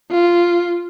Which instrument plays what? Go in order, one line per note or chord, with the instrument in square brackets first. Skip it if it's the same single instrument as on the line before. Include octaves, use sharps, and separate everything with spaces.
[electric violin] F4